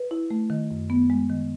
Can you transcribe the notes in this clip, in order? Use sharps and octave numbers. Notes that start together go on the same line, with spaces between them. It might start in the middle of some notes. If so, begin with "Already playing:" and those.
Already playing: B4
E4
A3
D#3
F#2
B3
G#3
D#3